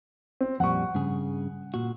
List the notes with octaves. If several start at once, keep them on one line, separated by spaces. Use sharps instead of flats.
C4
F2 A#2 G3 F#5 C#6
G2 C#3 G#4
A#2 F#4